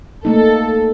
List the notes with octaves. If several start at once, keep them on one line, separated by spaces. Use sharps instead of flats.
A3 A#3 D#4 A4